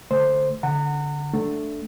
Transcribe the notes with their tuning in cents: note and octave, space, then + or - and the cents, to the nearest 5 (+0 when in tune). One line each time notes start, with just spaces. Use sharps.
D3 +0 A3 +0 C5 +0
D3 -15 F#5 +0 A#5 -35
A3 +0 D4 +0